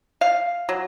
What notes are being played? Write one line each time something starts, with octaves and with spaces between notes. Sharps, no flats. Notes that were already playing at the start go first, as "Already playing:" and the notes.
F5
F#3